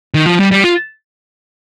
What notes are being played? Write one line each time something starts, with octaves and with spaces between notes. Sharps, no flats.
D#3
F3
G3
G3
F4